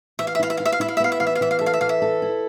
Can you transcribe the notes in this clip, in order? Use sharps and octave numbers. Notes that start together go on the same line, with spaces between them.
E3 E5
F5
E5
E4 F5
E5
E4 F5
E5
F5
E4 E5
F5
E5
B3 F5
E5
E3 F5
E5
F5
E3 E5
F5
A4 E5
F5
E5
E3 F5
E5
A4
E4